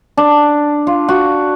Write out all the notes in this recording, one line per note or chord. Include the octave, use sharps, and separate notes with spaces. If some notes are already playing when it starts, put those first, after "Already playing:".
D4
F4
F#4